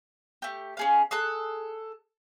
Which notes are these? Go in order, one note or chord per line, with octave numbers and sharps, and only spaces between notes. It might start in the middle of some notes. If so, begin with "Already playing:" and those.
A3 G4
C#4 G#4 F5
G#4 A4 F#6